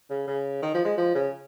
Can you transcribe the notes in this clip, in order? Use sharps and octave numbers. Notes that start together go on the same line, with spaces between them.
C#3
C#3
D#3
F3
G#3
F3
C#3